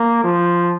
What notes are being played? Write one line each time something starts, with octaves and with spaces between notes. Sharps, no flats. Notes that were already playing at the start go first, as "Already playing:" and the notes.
Already playing: A#3
F3